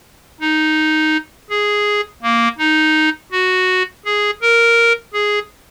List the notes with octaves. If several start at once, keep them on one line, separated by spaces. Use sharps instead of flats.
D#4
G#4
A#3
D#4
F#4
G#4
A#4
G#4